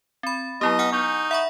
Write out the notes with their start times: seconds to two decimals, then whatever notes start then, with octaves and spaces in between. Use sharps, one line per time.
0.23 C4 B5 A6
0.61 F#3 B3 E4 G4 D#5 A#5
0.79 F#5 G#5 F6
0.93 D#4 C#6 G6
1.31 E5 F#5 B5 C#6